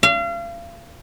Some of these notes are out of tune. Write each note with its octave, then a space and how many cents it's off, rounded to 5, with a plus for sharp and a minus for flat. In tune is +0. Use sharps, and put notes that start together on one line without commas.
F5 -35